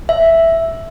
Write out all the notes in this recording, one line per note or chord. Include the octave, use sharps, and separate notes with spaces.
E5